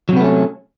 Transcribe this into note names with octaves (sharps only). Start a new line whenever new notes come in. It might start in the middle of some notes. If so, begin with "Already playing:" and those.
C3 F#3 A3 B3 C#4